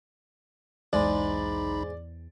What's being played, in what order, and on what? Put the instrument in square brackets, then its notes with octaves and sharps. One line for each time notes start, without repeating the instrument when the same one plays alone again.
[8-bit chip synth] B1 D#4 B5 [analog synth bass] E2 [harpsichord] G#2 G#3 [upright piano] D5